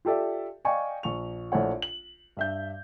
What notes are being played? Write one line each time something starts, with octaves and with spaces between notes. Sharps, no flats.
F4 G4 A4 D5 E5
D5 D#5 F5 G5 G#5 C#6
A#1 C#6 F7
A#1 A3 E4 C#5 F#5
F#7
G2 E5 G6